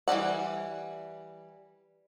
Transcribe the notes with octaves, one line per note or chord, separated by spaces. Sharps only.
E3 G3 D5 F#5